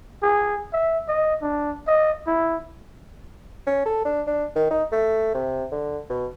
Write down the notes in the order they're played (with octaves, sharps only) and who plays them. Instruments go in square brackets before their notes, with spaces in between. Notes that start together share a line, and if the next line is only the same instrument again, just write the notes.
[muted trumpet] G#4
E5
D#5
D4
D#5
E4
[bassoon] C#4
A4
D4
D4
D#3
D#4
A3
C3
D3
B2